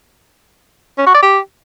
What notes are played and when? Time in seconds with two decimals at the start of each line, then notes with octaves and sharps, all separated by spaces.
0.98 C#4
1.06 F#4
1.14 D5
1.22 G4